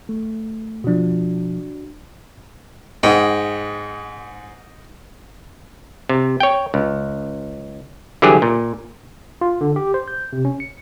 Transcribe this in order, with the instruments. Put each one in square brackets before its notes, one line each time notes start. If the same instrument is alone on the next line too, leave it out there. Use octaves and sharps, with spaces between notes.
[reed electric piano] A3
[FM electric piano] B2 F3 [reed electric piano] D4 F#4
[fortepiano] G#2 [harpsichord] D#5 F#5 G5
[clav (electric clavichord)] C3
C#5 G5
C#2
D3 E3 F#3 G3 G4 G#4
A#2
[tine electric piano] F4
D3
G4
C5
G6
C3
C#4
C#7